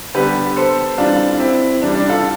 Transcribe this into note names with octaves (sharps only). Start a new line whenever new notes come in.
D3 G3 B3 G4 B4
A4 C5
E3 G3 C4 D4 F4
C4 E4
C3 E3 G3 D4
D4
F4 A4